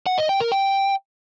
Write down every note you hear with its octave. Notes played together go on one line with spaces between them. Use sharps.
F#5
D#5
G5
A#4
G5